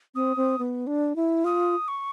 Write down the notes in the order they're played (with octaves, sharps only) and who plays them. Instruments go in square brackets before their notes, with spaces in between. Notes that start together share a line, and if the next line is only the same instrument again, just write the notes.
[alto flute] C4 [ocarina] D#6
[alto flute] C4
B3
D4
E4
[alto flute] F4 [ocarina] D#6
[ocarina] C#6